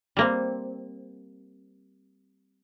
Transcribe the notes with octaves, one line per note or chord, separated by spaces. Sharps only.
G3 A#3 C4